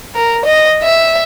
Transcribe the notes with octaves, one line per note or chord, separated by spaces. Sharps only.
A#4
D#5
E5